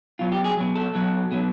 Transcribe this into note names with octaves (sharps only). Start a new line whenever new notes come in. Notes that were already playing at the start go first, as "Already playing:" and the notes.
B2 F#3 F4
G4
G#4
B2 F#3
A4
B2 F#3
B2 F#3